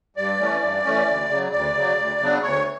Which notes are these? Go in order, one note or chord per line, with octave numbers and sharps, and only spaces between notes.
G2 D5
E3 A3 C#4
G2
E3 A3 C#4
D2
C#3 F#3
D2 D5
C#3 F#3
D2
C#3 F#3 B3 D4
D2 C#5